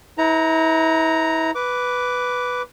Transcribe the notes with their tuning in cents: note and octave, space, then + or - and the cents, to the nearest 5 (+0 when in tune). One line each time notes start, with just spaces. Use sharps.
E4 -35 B4 +25 A#5 +0
B4 +0 D6 -10